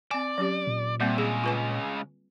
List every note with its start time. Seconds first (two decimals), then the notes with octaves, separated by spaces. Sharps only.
0.11 C4 D5 G#5
0.38 F#3 C#4 G4
0.67 A#2
1.00 C3 G3 A#3 C4
1.18 C#3 G#3 G#4
1.44 F4 B4 G#5